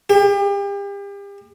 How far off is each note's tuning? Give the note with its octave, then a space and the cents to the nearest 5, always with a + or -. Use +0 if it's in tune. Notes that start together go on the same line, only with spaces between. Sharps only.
G4 +35